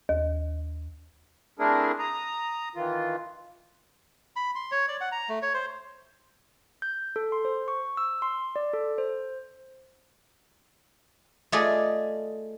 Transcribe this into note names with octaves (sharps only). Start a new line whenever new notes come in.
D#2
A3 C4 D4 E4 G#4 A#4
A#5 D#6
D#3 E3 F4
B5
C6
C#5
D5
F#5
A#5
A3
C#5
C5
G6
A4
C6
C5
C#6
E6
C6
D5
A4
C5
A3 F4 G#4 D5 D#5